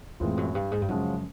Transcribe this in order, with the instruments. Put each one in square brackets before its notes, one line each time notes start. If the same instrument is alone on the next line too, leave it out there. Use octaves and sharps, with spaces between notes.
[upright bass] F2 [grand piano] A2 E3 G#3 C4 F4
[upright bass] F#2
G2
G#2
G2
[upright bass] F#2 [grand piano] C#3 F3 G#3 C#4 F#4